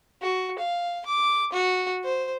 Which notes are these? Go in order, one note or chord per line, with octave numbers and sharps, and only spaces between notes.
F#4
F5
D6
F#4
C5